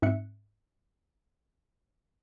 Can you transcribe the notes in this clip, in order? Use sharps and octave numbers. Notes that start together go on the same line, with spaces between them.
G#2 C4 E5 F#6 C#7